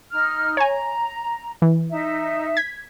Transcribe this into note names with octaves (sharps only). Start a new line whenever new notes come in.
D#4 F6
C#5 G#5 A#5
E3
D#4 E5
G#6 B6